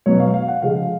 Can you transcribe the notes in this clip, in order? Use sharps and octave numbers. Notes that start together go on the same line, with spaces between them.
B2 F#3 C#5
F5
F5
F#5
C#3 F3 G#3 F5